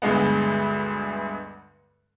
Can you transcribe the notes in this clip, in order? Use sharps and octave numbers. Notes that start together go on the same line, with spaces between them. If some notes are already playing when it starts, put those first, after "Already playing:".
D2 G2 G#3 B3